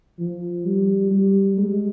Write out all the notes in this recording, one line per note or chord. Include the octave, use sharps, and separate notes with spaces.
F3
G3
G3
G#3